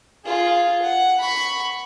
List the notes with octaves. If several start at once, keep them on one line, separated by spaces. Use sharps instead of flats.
F4 G#4
F#5
B5 C#6